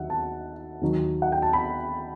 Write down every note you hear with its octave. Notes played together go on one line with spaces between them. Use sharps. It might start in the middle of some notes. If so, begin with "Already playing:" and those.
Already playing: D#2 D#3 F#3 E5 F#5
A5
D#2 D#3 F#3
F#5
G5
A5
B5